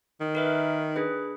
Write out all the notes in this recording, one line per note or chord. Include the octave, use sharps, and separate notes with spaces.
D#3
A#4 B4 E5
D4 G#4 B4